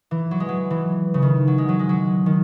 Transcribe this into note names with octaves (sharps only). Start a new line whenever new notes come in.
E3
F#3
G#3
F#3
E3
C#3
D#3
F#3
G#3
F#3
G#3
F#3
D#3